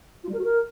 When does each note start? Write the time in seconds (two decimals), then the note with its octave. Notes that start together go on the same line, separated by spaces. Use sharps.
0.23 F4
0.28 G3
0.33 A#4
0.39 F#4
0.44 A#4